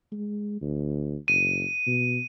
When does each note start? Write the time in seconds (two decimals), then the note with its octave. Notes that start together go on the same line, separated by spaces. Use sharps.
0.12 G#3
0.61 D2
1.28 F#1 D#7
1.86 B2